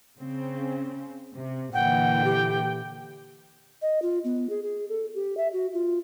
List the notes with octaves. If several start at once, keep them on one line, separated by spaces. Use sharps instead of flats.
C#3 C4
C3
A#2 D3 E3 F#5 G5
G4
D#5
F4
B3
G#4
G#4
A4
G4
E5
F#4
F4